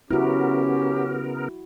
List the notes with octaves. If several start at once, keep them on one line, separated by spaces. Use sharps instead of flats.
C#3 B3 C#4 E4 F#4 G4 A#4